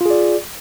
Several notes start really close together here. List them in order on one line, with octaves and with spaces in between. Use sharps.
F4 G#4 D5